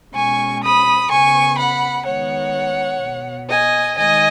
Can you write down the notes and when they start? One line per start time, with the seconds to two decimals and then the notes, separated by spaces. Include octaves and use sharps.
0.14 B2 G#3 C#4 G#5 C#6
0.62 B5 D#6
1.09 C#3 B3 G#5 C#6
1.58 F#5 B5
2.05 D#3 G#3 B3 C#5 F#5
3.01 B2
3.06 B3
3.48 D#5 G#5
3.97 D#3 G#3 D#5 G#5